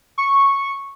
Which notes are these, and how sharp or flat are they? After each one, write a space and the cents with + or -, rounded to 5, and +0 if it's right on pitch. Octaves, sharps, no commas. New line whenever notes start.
C#6 -5